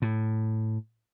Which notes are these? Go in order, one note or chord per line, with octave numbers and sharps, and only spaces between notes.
A2